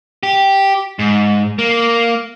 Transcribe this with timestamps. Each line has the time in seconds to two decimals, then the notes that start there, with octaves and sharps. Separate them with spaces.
0.23 G4
0.99 G#2
1.59 A#3